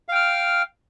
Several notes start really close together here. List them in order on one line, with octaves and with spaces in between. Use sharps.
F5 G5 F6